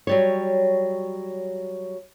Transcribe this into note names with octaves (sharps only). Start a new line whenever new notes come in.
F#3 G3 C#5